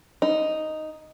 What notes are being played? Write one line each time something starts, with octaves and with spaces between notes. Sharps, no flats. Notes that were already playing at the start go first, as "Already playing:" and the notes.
D#4